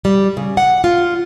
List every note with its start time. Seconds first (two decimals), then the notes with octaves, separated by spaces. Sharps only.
0.05 G3
0.37 C#3
0.57 F#5
0.84 F4